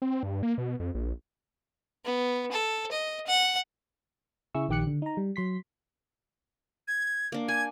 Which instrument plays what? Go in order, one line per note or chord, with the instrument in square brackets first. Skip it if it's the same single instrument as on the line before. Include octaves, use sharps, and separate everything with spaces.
[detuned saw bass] C4
G2
A#3
B2
F2
A#1
[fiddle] B3
A4
D#5
F#5
[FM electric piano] C#3 E4 G#4 C#6 E6
A#1 D#3 G4 D6 F#6 C#7
D3
D#4 A#5
G3
F#3 C6 B6
[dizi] G#6
[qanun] A#3 D4
[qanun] G#5 [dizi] G#6